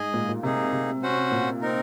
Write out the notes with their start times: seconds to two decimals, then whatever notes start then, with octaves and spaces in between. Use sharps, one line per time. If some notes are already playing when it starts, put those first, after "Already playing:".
Already playing: G#2 G#4 D#5 G#5
0.14 A#2
0.29 A#2
0.43 C3 A#3 D#4 G#4
0.73 C3
1.02 C#4 F#4 C5 F#5
1.32 A#2
1.61 C4 D#4 A#4